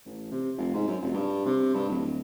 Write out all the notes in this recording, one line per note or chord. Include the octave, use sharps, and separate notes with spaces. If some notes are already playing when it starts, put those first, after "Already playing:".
A1
C3
F1
G#2
F#2
F1
G2
C3
G2
D1